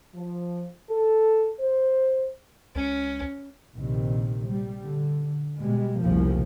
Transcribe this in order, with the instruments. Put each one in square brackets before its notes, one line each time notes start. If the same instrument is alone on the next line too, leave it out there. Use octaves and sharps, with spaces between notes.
[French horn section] F3
A4
C5
[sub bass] C#2 [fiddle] C#4
[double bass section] A#1 C3 D#3
G3
D3
B2 G3 G#3
F1 C2 C#3 F3 A#3